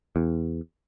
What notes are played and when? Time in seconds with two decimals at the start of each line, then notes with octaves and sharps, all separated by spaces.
0.16 E2